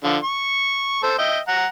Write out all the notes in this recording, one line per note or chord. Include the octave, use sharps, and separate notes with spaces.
D3 F3
C#6
A4 C5
D#5 E5 G5
F#5 A#5